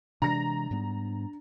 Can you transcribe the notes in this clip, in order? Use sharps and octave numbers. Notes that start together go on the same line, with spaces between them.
C3 E3 G#3 D4 A#5 A#6
G#2 G3 B3